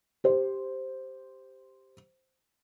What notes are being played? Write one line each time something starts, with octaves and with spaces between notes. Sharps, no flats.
G4 C5